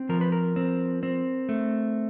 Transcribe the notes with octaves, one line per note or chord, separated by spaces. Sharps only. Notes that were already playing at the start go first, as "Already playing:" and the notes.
Already playing: C4
F3 A#4
B4
A#4
C4
C4
A3